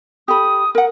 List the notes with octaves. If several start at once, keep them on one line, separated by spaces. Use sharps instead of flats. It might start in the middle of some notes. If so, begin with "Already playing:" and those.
G4 A4 B5 D#6
A#4 F#5